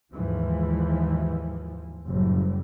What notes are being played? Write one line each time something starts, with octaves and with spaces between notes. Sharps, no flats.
D#2 G#2 E3 F3
F#1 A2 G3